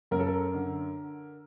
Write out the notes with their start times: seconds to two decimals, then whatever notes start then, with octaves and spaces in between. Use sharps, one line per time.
0.11 F#2 A#4
0.20 A4
0.27 A#4
0.54 D3